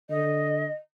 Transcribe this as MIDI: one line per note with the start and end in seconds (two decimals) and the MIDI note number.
0.10 0.67 50
0.10 0.71 75